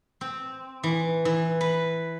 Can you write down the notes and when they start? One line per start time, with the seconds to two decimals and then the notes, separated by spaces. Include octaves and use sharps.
0.21 C4
0.83 E3
1.25 E3
1.61 B4